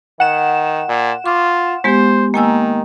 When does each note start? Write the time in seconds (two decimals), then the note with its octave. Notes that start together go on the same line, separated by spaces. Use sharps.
0.20 D#3 F#5 E7
0.89 A#2
1.26 F4 C#6 D6
1.84 G#3 B3 G4 C5
2.34 D#3 A#3 G#5 E6